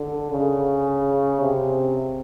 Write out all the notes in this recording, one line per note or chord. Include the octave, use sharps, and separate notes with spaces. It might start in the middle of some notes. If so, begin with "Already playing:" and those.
Already playing: D3
C#3
C3